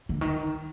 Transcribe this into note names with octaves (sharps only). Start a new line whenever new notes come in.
D3
D#3